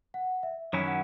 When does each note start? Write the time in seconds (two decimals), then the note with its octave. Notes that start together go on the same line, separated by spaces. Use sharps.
0.14 F#5
0.43 E5
0.73 F#2 D#3 F#3 C#4 E4 C#5
0.87 F#5